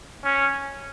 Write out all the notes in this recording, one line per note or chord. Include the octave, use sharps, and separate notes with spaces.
C#4